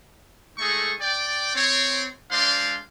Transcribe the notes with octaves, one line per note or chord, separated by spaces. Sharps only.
G#3 A3 D#4 G#4 A4 C#6
D5 G5
C4 C#5
G#3 D4 C5 D5 F5 C6